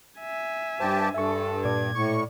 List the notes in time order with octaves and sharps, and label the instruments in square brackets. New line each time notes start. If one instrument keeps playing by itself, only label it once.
[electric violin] E5 G#5
[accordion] G2 G4 A5 [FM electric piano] D4 C5
[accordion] G2 [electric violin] A4 [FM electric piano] E5 G#5 C#6
[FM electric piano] A#2 D5 D6 [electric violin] G#6
[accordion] A2 C#6